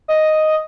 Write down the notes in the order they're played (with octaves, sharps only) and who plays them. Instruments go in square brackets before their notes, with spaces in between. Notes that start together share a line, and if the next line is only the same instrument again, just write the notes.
[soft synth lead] D#5